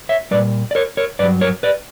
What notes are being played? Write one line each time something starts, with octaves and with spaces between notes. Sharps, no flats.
C#5 E5
A#2 G3 B4 D5
D5
A#4 C#5
A#4 C#5
G2 F#3 B4 D5
A#4 C#5
B4 D5